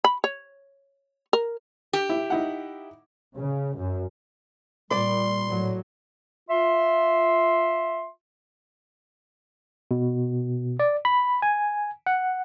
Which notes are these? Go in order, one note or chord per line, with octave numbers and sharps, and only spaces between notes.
B5
C#5
A#4
G4
E4
D#4 E4 F#5
C#3
F#2
A#2 G3 D5 C6
A2 F#3
F4 E5 C6
B2
D5
B5
G#5
F#5